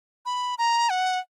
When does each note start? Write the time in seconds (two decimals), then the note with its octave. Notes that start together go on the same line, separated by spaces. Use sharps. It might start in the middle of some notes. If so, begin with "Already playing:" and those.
0.25 B5
0.58 A#5
0.90 F#5